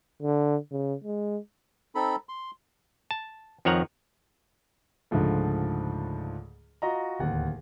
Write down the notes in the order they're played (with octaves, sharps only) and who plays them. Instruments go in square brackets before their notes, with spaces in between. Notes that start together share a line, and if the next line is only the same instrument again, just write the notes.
[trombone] D3
C#3
G#3
[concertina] C4 D#4 A4 B5
C6
[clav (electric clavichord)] A5
F2 D#3 F3 C#5 F#5 A#5
[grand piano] C#2 G#2 D3 F3 A3
F4 F#4 D#5 A#5
D1 D#2 F#5